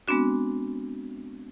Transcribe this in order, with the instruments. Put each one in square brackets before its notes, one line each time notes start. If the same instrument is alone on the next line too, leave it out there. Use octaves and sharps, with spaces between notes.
[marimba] G#3 B3 C4 D4 F#4